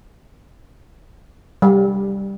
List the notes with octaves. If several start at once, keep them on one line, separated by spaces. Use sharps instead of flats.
G3